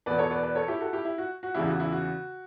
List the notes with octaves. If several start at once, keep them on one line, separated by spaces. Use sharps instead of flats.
E2 B2 B4 D5
A4 C#5
B4 D5
B4 D5
A4 C#5
E4 G4
F#4 A4
E4 G4
E4
F#4
F#4
E2 C#3 E3 E4 G4
F#4
E4
F#4